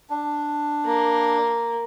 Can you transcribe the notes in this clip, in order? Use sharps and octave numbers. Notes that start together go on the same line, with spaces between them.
D4
A#3